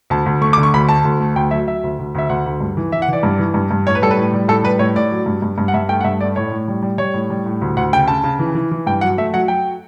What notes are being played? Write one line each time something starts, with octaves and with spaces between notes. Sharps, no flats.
D2 A5
D2
A3 C#6
D6
D3
C#6
D2 B5
A3 A5
D2
A3
D2 G5
F#3 E5
F#3 E5
D2
D2
D2 E5
D2 F#5
D2
G2
E3
E3 E5
F#5
E3 D5
G2
E3
G2
G2
A2 C#5
B4
G3 A4
B4
A2
G3
A2 A4
G3 B4
A2 C#5
A2 D5
F#3
G2
G2
G2
F#5
G2 E5
A3 G5
F#5
G2 E5
A3 D5
A2 C#5
A2
G3
G3
G3 C#5
A2
G3
A2
D2
D2 F#5
C#3 G5
C#3 A5
C#3
E3
E3
E3
G2 G5
F#3 F#5
A3 E5
F#3 F#5
F#3 G5